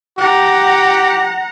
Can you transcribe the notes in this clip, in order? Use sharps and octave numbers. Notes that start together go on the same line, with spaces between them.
G4 F#5 A#5